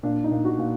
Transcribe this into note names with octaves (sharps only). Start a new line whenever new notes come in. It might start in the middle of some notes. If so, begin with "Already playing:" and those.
A#2 D4
D#4
A#2
F#4
A#2